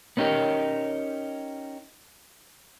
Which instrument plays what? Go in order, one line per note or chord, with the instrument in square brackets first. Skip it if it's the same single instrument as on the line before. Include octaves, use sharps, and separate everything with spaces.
[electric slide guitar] B3 C#4 D#4 G4 A#4 C#5